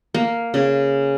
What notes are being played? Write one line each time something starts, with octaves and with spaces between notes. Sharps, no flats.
A#3
C#3